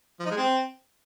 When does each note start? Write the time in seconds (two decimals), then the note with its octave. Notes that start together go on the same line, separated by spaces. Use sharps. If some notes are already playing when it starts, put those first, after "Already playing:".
0.20 F3
0.25 D#4
0.31 G#3
0.37 C4